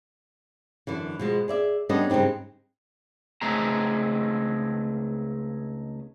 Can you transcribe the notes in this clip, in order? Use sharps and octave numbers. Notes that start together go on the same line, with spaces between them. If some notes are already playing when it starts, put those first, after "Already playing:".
F#2 D3 E3
B2 F3 G#3
G#4 D5 E5
G3 B3 C#4 D4 A4 D#5
G2 C#3 G#3 C4 D#4
C#2 A3 C4 D#4 G#4 A#5